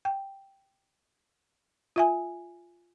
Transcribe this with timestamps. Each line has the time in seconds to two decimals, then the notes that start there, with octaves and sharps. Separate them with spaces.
0.05 G5
1.96 F4 E5 G#5